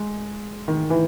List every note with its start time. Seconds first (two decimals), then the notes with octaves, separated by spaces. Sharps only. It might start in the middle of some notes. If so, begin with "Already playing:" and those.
Already playing: G#3
0.68 D#3
0.90 E3